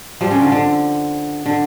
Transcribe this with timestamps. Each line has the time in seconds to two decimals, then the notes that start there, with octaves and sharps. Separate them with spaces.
0.21 F3 G3
0.31 C#3
0.41 D3
0.52 D3
1.46 D3